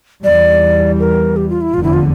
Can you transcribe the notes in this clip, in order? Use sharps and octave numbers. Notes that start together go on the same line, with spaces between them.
E2 E3 G3 D5
A#4
G4
F4
E4
F1 E2 D3 F4
E4
F4